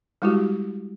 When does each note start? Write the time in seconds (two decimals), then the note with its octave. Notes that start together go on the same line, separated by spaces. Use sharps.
0.22 G3 G#3 E4 F#4 G4